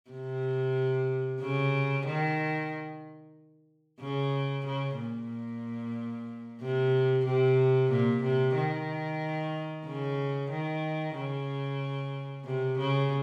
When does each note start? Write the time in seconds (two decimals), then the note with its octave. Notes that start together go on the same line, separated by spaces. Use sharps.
0.10 C3
1.41 C#3
2.06 D#3
4.00 C#3
4.65 C#3
4.98 A#2
6.61 C3
7.25 C3
7.90 A#2
8.23 C3
8.56 D#3
9.86 C#3
10.50 D#3
11.15 C#3
12.45 C3
12.78 C#3